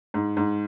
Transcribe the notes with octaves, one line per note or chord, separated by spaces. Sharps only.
G#2
G#2